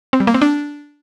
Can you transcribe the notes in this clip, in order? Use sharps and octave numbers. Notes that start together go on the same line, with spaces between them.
C4
G3
A#3
C4
D4